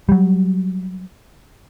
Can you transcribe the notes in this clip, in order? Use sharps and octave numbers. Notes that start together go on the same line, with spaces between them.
F#3 G3